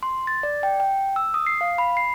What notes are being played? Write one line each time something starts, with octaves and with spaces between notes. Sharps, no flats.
C6
A6
D5
G5
G5
E6
D#6
C7
F5
B5
C7